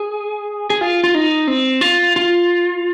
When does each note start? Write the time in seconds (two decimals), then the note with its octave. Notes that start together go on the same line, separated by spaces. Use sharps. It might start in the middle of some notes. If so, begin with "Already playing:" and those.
Already playing: G#4
0.70 G#4
0.81 F4
1.04 F4
1.15 D#4
1.47 C4
1.81 F4
2.16 F4